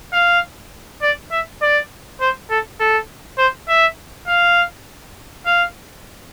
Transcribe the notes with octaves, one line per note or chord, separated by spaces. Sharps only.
F5
D5
E5
D5
C5
A4
A4
C5
E5
F5
F5